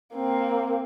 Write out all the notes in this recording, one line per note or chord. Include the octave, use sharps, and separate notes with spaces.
A#3 C4